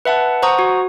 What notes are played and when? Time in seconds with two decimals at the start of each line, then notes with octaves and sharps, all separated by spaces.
0.05 B4 E5 F#5 A5
0.42 C5 F#5 A#5 C#6 D#6
0.59 F#4